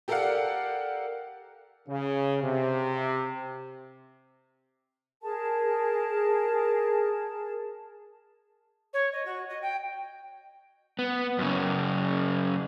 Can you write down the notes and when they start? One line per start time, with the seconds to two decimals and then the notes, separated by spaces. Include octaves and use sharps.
0.08 G4 A4 A#4 D5 F5 F#5
1.88 C#3
2.42 C3
5.22 G#4 A#4 A5
8.93 C#5
9.12 D#5
9.25 F#4
9.49 D#5
9.62 G5
10.99 B3
11.39 F#2 C#3